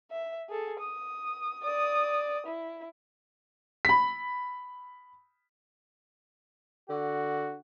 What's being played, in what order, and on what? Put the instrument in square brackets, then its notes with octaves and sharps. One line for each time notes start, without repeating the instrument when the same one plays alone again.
[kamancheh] E5
G#4 A4
D#6
D5 D#6
E4
[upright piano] B5 B6
[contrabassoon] D3 [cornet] F#4